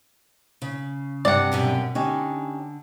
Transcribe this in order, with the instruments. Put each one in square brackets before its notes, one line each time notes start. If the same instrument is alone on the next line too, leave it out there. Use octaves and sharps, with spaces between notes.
[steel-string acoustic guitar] C#3
[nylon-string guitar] G2 C3 G3 [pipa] D5 F#5
[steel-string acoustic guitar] F#2 B2 G4
[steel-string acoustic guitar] D3 [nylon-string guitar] C#4 D#4 G4